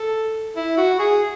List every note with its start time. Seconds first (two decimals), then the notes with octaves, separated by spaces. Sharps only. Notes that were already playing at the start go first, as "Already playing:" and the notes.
Already playing: A4
0.56 E4
0.78 F#4
0.99 G#4